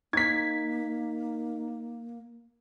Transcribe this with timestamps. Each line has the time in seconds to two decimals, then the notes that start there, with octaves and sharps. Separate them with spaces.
0.13 A#3 D#4 G#6 B6